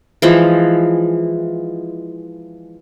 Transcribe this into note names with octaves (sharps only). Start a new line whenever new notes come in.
E3 F3 G#3